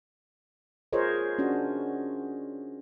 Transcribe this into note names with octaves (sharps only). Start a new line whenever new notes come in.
F4 G#4 A#4 C5 C#5 D#5
C#4 D4 F#4